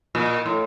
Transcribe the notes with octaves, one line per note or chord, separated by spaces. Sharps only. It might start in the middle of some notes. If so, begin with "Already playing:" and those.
A#2
A2